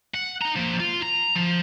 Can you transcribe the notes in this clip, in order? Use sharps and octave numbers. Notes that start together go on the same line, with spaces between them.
F#5
D#4 A#5
F3 A#3
F4
A#5
F3